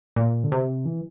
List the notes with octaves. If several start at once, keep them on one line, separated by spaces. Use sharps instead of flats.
A#2
D3
C3
E3